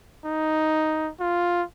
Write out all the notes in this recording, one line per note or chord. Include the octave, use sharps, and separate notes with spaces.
D#4
F4